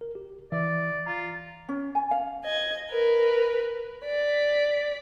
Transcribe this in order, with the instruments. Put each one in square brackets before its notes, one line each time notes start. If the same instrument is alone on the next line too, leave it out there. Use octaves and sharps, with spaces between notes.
[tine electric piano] A#4
G4
[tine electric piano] E3 E5 [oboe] D5
[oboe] F4 [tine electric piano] A#5
[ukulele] C#4
G#5
F5
[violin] D#5 G#6
A#4 B4
D5 B6